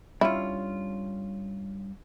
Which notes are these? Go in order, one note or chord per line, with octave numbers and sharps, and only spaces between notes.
G2 C#4 E4 F4